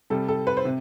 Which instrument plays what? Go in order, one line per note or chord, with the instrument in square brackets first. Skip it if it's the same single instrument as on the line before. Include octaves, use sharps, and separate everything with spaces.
[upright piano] C3 G3 A4
A4
B4
C5
C3